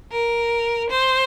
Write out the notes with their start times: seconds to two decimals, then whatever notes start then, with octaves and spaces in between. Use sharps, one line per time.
0.11 A#4
0.90 C5